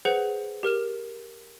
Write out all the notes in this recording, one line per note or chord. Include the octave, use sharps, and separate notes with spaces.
G#4 B4 C5 F#5 C#7 F7
G4 A#4 F6 E7